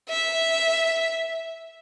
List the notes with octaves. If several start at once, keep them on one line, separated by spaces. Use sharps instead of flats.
E5